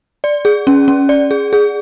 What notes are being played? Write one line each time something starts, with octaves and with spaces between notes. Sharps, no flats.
D5
G#4
C#4
C#4
D5
G#4
G#4